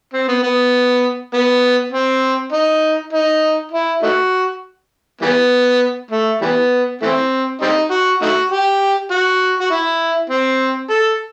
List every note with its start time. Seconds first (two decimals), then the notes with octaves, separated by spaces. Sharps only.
0.14 C4
0.28 B3
0.43 B3
1.34 B3
1.93 C4
2.53 D#4
3.13 D#4
3.72 E4
4.03 A3 D#4 F#4
5.21 E3 G3 B3
6.11 A3
6.41 E3 G3 B3
7.02 E3 A3 C4
7.62 G3 C4 D#4
7.91 F#4
8.22 A3 D#4 F#4
8.51 G4
9.11 F#4
9.61 F#4
9.71 E4
10.30 C4
10.90 A4